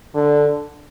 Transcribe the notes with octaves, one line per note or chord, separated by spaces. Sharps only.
D3